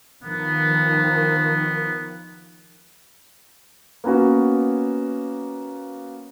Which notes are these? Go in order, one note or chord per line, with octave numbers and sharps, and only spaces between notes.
D#3 F3 B3
A#3 B3 C#4 F#4